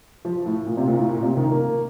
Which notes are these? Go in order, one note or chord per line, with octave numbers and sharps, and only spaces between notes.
F3
A2
A#2
C3
A#2
A2
A#2
C3
D#3
A#3